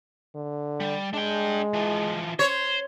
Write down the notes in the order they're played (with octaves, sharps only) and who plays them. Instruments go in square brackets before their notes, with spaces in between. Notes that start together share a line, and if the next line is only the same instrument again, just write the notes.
[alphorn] D3
[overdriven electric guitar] G3
[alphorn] G#3 [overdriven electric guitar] D4 G5
[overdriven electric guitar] E3 F3
[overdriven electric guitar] C5 [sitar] C#5